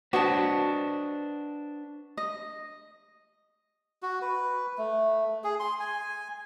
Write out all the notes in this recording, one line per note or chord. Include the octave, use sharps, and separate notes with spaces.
D4 F#4 B4 C5 D#5 A5
D#5
F#4
B4
A3
G#4
C6
G#5